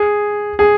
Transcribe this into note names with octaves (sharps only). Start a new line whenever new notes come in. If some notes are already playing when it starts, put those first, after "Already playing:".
Already playing: G#4
G#4